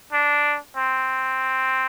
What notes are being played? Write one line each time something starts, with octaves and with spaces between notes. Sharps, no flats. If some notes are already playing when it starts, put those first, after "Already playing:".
D4
C4